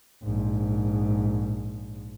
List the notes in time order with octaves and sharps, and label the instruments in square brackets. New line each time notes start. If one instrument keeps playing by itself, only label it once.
[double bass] A#1 G#2